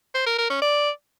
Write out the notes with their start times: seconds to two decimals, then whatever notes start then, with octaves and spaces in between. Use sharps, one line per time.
0.14 C5
0.26 A#4
0.38 A#4
0.50 C#4
0.62 D5